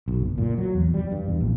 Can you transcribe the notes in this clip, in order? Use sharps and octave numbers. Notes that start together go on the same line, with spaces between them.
B1
F#1
A#2
F#3
E2
G3
G2
E2
A#1